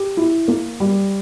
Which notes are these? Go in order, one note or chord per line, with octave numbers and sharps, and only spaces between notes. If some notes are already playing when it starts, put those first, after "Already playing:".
Already playing: G4
E4
A#3
G3